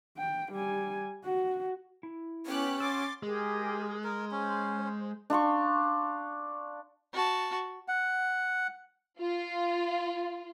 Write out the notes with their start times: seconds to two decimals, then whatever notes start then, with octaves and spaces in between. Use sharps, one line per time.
0.18 G5
0.52 G3 G#5
1.24 F#4
2.03 E4
2.46 B3 C#4 G4 F#6
2.80 F#4 C6 D6 E6 A6
3.23 G#3 G4 G#4 A#4
4.04 A#4
4.32 C#4 C5
5.30 D4 F5 C6 C#6
7.14 F#4 A5
7.88 F#5
9.20 F4